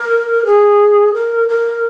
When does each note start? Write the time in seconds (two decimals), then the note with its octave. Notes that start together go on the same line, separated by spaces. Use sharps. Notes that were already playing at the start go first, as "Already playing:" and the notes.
Already playing: A#4
0.45 G#4
1.13 A#4
1.48 A#4